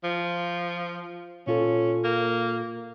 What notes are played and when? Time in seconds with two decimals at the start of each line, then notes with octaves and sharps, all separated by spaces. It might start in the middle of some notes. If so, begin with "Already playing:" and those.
0.04 F3
1.47 A#2 C#4 F4 A4
2.04 A#3